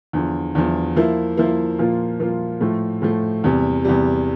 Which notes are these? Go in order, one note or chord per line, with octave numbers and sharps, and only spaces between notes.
E2 D3 F3
E2 D3 F3
F3 A#3 E4
F3 A#3 E4
A#2 F3 A#3 F4
A#2 F3 A#3 F4
A2 F3 A3
A2 F3 A3
E2 C3 G3
E2 C3 G3